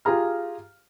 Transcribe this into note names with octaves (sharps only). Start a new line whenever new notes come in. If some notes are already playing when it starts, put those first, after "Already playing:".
F4 G4 G#4 A#5 F6